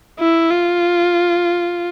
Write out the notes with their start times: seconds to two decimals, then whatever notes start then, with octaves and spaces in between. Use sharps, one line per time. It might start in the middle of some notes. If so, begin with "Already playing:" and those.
0.19 E4
0.51 F4